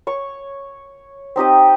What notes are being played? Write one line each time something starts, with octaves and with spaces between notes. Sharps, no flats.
C#5 C#6
C4 D#4 G4 D#5